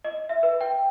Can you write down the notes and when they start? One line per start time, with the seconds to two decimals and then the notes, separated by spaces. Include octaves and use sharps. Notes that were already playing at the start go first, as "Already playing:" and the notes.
0.04 D#5
0.29 E5
0.43 B4
0.61 G5